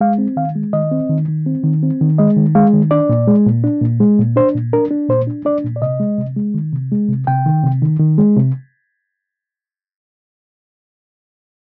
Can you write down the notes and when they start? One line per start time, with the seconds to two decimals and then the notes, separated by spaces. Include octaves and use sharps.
0.01 G#3 F5
0.18 C4
0.37 D#3 F5
0.55 G#3
0.73 D#3 D#5
0.92 C4
1.09 D#3
1.28 D#3
1.46 C4
1.64 D#3
1.83 C4
2.01 D#3
2.18 G#3 D#5
2.37 D#3
2.55 G#3 F5
2.73 D#3
2.91 D4 D5
3.09 A#2
3.27 G#3
3.46 A#2
3.64 D4
3.82 A#2
4.00 G#3
4.19 A#2
4.36 D4 C5
4.54 A#2
4.73 D4 A#4
4.91 D4
5.09 A#2 C5
5.27 D4
5.45 D4 D5
5.64 A#2
5.76 D5
5.82 C3 D#5
6.00 G#3
6.18 C3
6.37 G#3
6.54 D#3
6.73 C3
6.92 G#3
7.09 C3
7.27 C3 G5
7.46 D#3
7.64 C3
7.82 D#3
7.99 D#3
8.18 G#3
8.37 C3